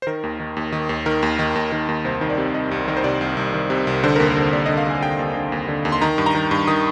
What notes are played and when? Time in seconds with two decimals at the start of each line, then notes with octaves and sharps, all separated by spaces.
0.02 C5
0.07 D#3 A#4
0.23 D#2
0.40 D#3
0.57 D#2
0.72 D#3
0.89 D#2
1.06 D#3 A#4
1.23 D#2
1.39 D#3
1.55 D#2
1.72 D#3
1.89 D#2
2.05 C2 C5
2.21 D#3
2.30 D5
2.38 C3
2.54 C2 D#5
2.71 C2
2.88 D#3 A#4
2.97 C5
3.04 C3 D5
3.21 C2
3.37 C2
3.54 D#3
3.70 C3
3.87 C2
4.04 D3 C5
4.16 A#4
4.20 D#2
4.28 A#4
4.36 D3 C5
4.53 D#2 D5
4.66 D3 D#5
4.77 F5
4.86 D#2 G#5
5.02 D3 G5
5.19 D#2
5.36 D3
5.52 D#2
5.68 D3
5.85 D#2
5.92 C6
6.01 D#3 A#5
6.18 G2
6.26 A#5
6.35 D#3
6.51 G2
6.68 D#3 D#6